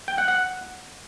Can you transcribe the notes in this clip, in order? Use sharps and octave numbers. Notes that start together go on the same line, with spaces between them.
G5
F#5
F#5